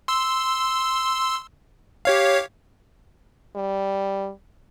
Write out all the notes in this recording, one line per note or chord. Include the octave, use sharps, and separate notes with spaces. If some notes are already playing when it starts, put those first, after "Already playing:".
C6 E6
G4 C#5 F5
G3